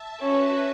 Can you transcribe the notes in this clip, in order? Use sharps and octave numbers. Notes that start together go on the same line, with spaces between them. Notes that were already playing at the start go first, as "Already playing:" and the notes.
Already playing: E5 A5
C#4 F#4 B4